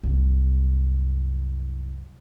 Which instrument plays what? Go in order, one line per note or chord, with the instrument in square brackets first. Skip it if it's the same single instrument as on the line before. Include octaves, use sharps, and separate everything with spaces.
[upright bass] C2 F#2